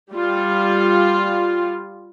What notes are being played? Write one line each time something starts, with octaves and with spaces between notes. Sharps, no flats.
G3 F4